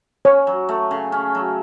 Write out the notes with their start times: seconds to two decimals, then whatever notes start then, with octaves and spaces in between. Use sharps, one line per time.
0.25 C#4 C#5
0.47 F#3
0.69 A3
0.91 C#3
1.12 C#4
1.35 F#3